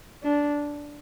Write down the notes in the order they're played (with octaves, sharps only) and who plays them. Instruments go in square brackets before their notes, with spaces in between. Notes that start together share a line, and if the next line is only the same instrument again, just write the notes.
[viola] D4